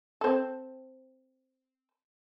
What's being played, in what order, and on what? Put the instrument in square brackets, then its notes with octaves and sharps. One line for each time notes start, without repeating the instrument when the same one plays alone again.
[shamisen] C4 A4